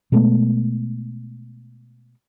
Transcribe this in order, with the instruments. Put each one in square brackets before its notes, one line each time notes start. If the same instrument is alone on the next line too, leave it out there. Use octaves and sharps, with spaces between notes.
[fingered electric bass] B2 G#3 A3 B3